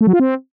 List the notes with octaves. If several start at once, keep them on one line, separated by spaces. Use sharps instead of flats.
A3
F#3
F4
C4